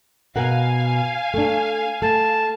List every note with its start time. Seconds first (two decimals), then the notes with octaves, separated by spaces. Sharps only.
0.36 B2 A#4 F5 F#5 G#5
1.34 A3 D4
2.02 A3 A5